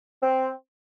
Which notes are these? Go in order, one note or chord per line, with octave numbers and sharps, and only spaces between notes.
C4